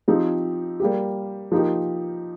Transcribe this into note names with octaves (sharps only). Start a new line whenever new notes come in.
F3 C4 D#4 G4
G3 A#3 G4
F3 A#3 D#4 G4